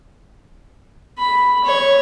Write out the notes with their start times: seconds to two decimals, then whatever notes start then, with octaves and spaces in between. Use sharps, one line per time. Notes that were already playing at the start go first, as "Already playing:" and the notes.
1.18 B5
1.64 C#5